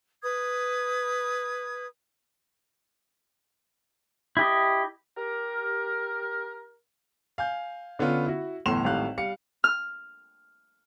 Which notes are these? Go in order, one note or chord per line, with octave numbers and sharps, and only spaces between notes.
B4 D#6 G#6
E4 G4 D#5
G4 A#4
F5 G#5 G6
D3 B3 C#4 F4
E4 F#4
G1 E2 A2 C6 E7 F7
G#1 A2 G3 F5 F#6
G3 F5 C#7
F6